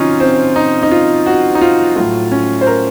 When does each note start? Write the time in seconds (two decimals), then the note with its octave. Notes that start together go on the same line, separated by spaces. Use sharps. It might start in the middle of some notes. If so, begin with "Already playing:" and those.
Already playing: C3 D#3 F#3 C#4 D#4 F4
0.20 C4
0.56 D#4
0.83 D#4
0.91 F4
1.26 F#4
1.55 D#4
1.61 F4
1.96 A2 F#3 A3 F4
2.31 C#4
2.61 C5
2.67 A#4